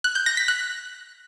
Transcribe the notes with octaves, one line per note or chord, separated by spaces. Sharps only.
F#6
G6
A#6
B6
F#6